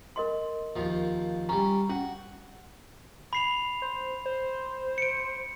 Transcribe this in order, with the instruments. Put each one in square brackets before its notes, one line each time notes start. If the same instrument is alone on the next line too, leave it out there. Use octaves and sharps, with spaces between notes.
[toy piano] A#4 D#5 C6
[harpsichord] D#2 F3
[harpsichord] G3 C#4 [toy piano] A#5
[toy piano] C#4 [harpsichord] F#4
[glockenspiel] B5 C7 F7
[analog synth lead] C5
C5
[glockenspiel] C#7 D7